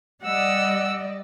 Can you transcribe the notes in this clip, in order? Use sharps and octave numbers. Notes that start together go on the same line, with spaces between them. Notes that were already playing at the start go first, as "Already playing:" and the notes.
G3 D5 D#5 F#5 E6